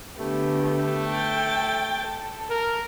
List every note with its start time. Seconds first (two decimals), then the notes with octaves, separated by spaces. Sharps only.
0.19 D3 A3 B3 G4
0.63 A3
1.10 G5 A6
2.06 A4
2.50 A#4